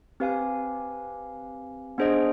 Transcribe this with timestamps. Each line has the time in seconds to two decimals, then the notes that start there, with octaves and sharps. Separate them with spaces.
0.20 C4 G4 B4 F5 G#5
1.98 B3 D4 G#4 C5 D#5